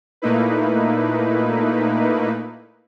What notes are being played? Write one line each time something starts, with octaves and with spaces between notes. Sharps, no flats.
A#2 A3 A#3 D#4 E4 B4